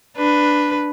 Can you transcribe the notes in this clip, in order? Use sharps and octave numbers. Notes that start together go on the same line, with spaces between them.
D4 B4